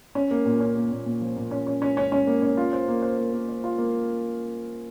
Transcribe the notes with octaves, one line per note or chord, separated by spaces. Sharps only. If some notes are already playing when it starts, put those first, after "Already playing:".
C#4
A#3
A#2
C#4
A#3
A#2
A#2
F3
A#2
C#4
C#4
C#4
C#4
C#4
A#3
C#4
F4
C5
A#3
C5
A#3
A#3
C5
F4
A#3